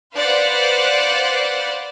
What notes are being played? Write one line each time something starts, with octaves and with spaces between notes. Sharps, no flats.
B4 C5 D5 F5 F#5